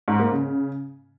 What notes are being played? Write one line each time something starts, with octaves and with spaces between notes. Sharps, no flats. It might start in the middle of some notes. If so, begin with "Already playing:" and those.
G#2
A#3
C#3